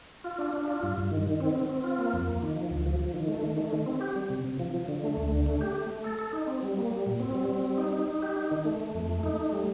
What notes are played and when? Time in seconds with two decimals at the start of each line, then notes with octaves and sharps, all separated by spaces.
0.24 F4
0.38 D4
0.53 D4
0.68 F4
0.83 G2
0.97 G2
1.11 D#3
1.26 D#3
1.40 C4
1.55 C4
1.69 C4
1.84 F4
1.99 A#3
2.13 F2
2.27 A#3
2.42 D#3
2.56 F3
2.70 D2
2.86 F3
3.00 F3
3.14 D#3
3.28 A3
3.43 D#3
3.58 A3
3.73 D#3
3.86 C4
4.01 G4
4.16 G3
4.30 C3
4.44 C3
4.59 F3
4.74 F3
4.88 D3
5.03 A3
5.17 D2
5.32 D3
5.46 A3
5.61 G4
5.75 A3
5.90 A3
6.04 A4
6.19 A4
6.33 D#4
6.47 C4
6.63 G3
6.77 A#3
6.91 G3
7.06 A#2
7.20 C4
7.35 G3
7.49 C4
7.64 G3
7.78 D#4
7.93 D#4
8.08 D#4
8.22 G4
8.36 D#4
8.51 D#3
8.65 A3
8.80 A3
8.94 F2
9.09 A3
9.23 D#4
9.37 A3
9.53 G3